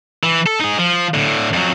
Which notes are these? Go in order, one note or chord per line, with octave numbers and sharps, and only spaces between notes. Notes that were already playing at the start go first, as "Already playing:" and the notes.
E3
A4
D#4 G#4
F3
A2 D3
F2 F#3